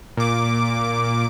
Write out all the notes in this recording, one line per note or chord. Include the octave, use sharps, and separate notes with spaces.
A#2 D6